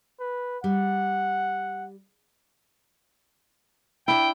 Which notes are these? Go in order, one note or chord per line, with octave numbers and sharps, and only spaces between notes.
B4
G3 F#5
D4 E4 G5